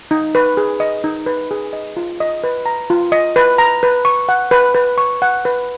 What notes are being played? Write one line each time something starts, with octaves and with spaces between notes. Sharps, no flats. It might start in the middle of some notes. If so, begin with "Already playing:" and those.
D#4
B4
G#4
D#5
D#4
B4
G#4
D#5
F4
D#5
B4
A#5
F4
D#5
B4
A#5
B4
C#6
F#5
B4
B4
C#6
F#5
B4